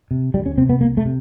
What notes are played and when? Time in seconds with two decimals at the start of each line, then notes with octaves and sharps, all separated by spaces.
0.11 C3
0.34 D2 G3
0.46 C#4
0.57 C3 C4
0.69 B3
0.81 C2 A#3
0.97 A3
1.05 C3